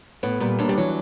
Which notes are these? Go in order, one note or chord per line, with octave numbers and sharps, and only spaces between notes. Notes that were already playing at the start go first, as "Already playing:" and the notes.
A2 B3
A#2 G3
D#2 D#3 D4
G3
E3 F#3